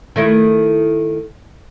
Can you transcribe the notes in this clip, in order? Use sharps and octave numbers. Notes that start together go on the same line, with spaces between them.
D#3 A3 E4